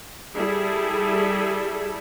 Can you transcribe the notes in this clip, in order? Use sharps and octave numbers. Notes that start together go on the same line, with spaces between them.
G3 E4 G#4 A4